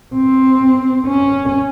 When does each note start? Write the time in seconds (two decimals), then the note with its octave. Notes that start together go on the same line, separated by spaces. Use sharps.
0.15 C4
1.07 C#4